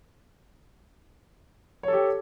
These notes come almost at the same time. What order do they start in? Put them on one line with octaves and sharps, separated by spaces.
C#5 A4 G4